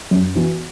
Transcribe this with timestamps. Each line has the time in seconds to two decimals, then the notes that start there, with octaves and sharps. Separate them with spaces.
0.11 F#2
0.35 E3 B3 F#4